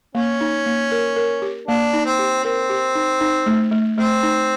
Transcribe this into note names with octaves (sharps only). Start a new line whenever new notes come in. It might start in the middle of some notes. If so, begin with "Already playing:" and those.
A#3 C#4
D#4
A#3
A#4
A#4
G4
A#3 D4
D#4
C4
G4
C4 A#4
G4
D#4
D#4
A3
A3
A3 C4
D#4